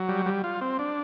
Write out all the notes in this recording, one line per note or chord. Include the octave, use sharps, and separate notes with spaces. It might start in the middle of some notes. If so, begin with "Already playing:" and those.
Already playing: F#3
G3
G3
F4
C4
D4